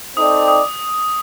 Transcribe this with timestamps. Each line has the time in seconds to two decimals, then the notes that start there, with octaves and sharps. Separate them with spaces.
0.17 C4 D#4 A4 D5 G5 D#6
0.48 D#6